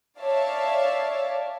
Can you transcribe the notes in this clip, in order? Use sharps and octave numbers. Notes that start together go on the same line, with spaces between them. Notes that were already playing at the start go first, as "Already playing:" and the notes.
C#5 D5 E5 F5 A5